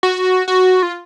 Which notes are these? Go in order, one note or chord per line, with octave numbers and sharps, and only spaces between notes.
F#4
F#4
F4